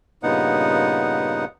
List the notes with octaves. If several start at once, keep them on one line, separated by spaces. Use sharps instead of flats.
G2 A#2 C#3 B3 D#4 F#5